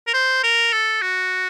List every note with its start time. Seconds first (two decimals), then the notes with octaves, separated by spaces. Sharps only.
0.07 A#4
0.14 C5
0.43 A#4
0.73 A4
1.02 F#4